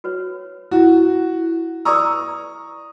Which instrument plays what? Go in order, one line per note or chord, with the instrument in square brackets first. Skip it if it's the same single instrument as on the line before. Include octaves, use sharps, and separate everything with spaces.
[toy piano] F#4 B4 C#5
[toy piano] E4 [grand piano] F#4
[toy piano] B4 D5 E6 [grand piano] A#5 C#6 D#6